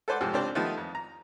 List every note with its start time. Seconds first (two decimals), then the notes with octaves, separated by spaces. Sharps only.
0.08 A4 B4 C5 D5 F#5
0.21 G#2 C3 F3 G4
0.33 C#2 C4 D4 G4 C5 D5
0.55 D#3 F3 G3 A3 B3 D#4
0.78 F2
0.95 A#5